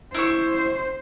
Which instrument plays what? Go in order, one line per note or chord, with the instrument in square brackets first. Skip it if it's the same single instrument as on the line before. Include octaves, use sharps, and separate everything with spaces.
[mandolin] E4 E5 C#6 [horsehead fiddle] C5